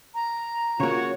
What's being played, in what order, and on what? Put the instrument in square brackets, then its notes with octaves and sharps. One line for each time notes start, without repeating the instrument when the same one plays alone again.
[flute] A#5
[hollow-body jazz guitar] C#3 A#3 [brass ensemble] F4 F#4 [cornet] C#5